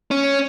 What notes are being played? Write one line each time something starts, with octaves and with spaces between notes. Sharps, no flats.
C#4